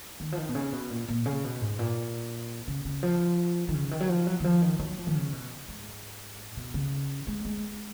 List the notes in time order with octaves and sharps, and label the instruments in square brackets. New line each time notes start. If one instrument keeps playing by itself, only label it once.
[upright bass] D#3
F3
D#3
B2
C#3
B2
A#2
A#2
C#3
B2
G#2
A#2
C#3
C#3
F3
D#3
C#3
D#3
F#3
F3
F#3
D#3
F3
D#3
F#3
F3
D#3
C#3
B2
G#2
B2
C#3
G#3
G#3